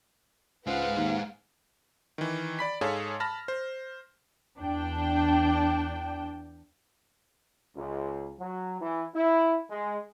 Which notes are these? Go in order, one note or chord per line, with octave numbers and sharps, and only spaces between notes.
C#2 G#3 B4 C5 F5 F#5
D#2
D#3 E3
D5 B5 B6
G#2 G#4 A4 C#5 F5 A5
A5 B5 F6 A#6
C5
E2 D4 G5
C#2
F#3
E3
E4
G#3